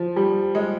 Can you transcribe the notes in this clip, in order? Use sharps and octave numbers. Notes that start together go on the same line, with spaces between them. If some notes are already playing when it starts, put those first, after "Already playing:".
Already playing: F3
G3
G#3